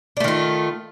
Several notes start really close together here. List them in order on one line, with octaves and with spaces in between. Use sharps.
D4 A3 D#3 F4